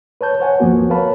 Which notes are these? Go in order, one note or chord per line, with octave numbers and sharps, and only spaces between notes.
B4 C#5 A5 G6
C5 C#5 F#5 G#5
D2 G2 F3 A#3 B3 F#4
A#4 B4 C#5 F5 A5 B5